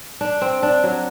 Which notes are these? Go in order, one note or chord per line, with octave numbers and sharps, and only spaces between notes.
D4
C4
D4
F#3